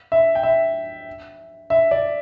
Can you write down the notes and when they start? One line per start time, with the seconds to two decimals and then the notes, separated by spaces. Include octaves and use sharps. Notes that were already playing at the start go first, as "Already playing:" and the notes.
0.12 E5
0.35 G5
0.43 E5
1.70 E5
1.91 D5